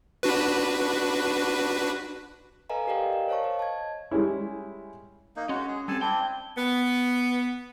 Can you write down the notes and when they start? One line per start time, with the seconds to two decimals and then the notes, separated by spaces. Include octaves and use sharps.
0.23 D4 F#4 B4
2.70 A4 B4 D#5 F5 G#5 A#5
2.87 G4 A#4 D5 D#5 F5 G5
3.13 A#4
3.28 C5 C#5 F5 A5 C#6
3.44 D#5
3.59 A5 G#6
4.11 G3 G#3 C#4 E4
5.36 A#3 D#4
5.49 G#3 C#4 F#4
5.68 G#4
5.88 G3 C4 A4 G#5 A5
6.01 C4 D4 E4 G5
6.58 B3